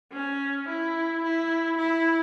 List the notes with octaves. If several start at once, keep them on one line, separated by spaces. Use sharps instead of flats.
C#4
E4
E4
E4